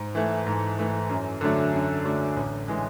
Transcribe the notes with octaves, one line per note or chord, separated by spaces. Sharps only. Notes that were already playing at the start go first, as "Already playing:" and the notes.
Already playing: G#2
E3 A3
G#2
E3 A3
F#2
D3 F#3 A3 D4
F#2
D3 F#3 A3 D4
A1
E3 G#3